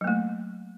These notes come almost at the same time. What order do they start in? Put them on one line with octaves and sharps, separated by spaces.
F#3 A#3 A3